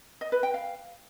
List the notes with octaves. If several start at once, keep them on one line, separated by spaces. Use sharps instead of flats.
D#5
B4
G5
F5